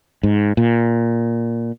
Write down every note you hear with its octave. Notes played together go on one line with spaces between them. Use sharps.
G#2
A#2